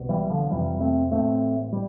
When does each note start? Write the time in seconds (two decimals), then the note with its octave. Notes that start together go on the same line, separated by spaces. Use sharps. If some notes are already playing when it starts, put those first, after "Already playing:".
Already playing: C2 B2
0.09 E3 G3
0.30 D3 F3
0.50 F1 F2 C3 E3 G3
0.80 A3 C4
1.11 A1 A2 A3 C4
1.73 G3